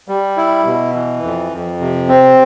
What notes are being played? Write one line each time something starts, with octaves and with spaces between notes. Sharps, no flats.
G3
E4
B2
E3
F2
F2
C3
C4